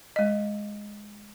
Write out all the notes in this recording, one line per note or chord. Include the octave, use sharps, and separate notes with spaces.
G#3 D#5